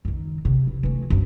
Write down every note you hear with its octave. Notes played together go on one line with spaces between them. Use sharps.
F#1 D#3
C3
E3
E3 A3
F#2 D4